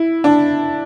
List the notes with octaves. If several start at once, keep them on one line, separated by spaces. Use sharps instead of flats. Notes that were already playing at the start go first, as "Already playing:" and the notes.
Already playing: E4
D4